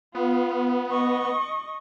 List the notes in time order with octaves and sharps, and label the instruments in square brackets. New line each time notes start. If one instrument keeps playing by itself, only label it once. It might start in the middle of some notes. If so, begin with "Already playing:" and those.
[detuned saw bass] B3 [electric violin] F4
[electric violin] D#5 C#6